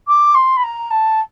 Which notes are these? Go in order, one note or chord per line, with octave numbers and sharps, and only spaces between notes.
D6
C6
B5
A#5
A5